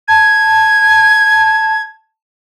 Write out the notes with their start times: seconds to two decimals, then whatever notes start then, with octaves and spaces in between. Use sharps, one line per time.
0.08 A5 G#6